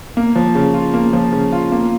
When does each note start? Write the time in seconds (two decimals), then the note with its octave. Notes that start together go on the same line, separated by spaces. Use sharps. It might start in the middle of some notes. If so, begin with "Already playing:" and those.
0.17 A#3
0.36 F3
0.55 C#3
0.74 F4
0.94 A#3
1.13 F3
1.33 C#3
1.53 F4
1.72 A#3